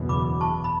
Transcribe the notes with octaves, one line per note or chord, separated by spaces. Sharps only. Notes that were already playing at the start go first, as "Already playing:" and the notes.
Already playing: F#1 E2 B2
B5 D6
A5 C#6
B5